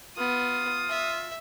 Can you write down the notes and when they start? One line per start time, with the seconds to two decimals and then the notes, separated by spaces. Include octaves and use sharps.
0.18 B3 F4 D#6
0.89 E5